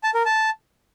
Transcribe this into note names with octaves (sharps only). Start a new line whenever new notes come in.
A5
A#4
A5